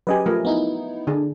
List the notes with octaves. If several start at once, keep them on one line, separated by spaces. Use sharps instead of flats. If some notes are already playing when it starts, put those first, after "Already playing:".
F#3 C#4 G4 B4 D#5 G#5
F3 A3 A#4
B3 D#4 E4
D3 D4 G#4